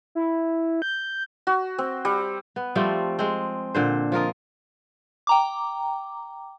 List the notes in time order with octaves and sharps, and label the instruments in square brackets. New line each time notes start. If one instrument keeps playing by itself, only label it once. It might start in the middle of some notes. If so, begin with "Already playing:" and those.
[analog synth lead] E4
G6
[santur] F#4
C4
G3
[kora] B3
F3 G3 A3 C4
G#3 C4
A#2 D3 C5
F3 F4 A#4 D#5
[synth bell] G5 A#5 D6